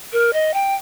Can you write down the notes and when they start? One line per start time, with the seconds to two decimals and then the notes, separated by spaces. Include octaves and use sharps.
0.13 A#4
0.33 D#5
0.54 G5